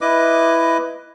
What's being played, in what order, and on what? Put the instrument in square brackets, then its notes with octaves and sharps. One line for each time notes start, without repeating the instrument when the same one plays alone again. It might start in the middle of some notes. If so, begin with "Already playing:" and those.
[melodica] E4 B4 D#5 D6